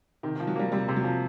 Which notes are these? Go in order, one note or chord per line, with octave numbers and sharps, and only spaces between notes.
C3 D#3
D#3 F3
F#3
G3 A#3
C3 G3
C3 G3
F#3
F3